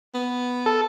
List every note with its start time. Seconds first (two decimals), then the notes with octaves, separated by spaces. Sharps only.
0.14 B3
0.66 A4